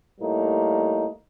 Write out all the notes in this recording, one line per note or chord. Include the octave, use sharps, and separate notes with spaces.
A2 G3 A#3 D#4